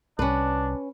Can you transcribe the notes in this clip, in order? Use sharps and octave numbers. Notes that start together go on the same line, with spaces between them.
C2 C#4 D4 B4